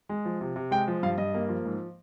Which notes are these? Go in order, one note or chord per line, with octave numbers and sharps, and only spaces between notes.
G#3
F3
C3
C3
G#3 G5
F3
G2 F5
G2 D#5
A#3
F3
G#2